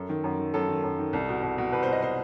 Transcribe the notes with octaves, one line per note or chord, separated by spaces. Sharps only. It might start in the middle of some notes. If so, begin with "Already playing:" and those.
Already playing: F#2 A4
D#3
F#2
D#3
F#2 A4
D#3
F#2
D#3
C2
B2
C2
B2
C2 B4
C5
B2 D#5
C5